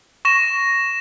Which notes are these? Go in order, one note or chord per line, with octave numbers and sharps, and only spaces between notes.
C#6 A#6 E7